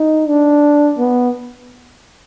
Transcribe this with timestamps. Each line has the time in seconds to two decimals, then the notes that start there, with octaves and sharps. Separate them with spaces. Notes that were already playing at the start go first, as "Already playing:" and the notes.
Already playing: D#4
0.28 D4
0.98 B3